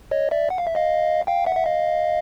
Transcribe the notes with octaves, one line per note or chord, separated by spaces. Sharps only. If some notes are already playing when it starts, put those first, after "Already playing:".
C#5 D#5
D5 E5
F#5
F5
E5
D#5 F5
F5 G5
E5 F#5
E5
D#5 F5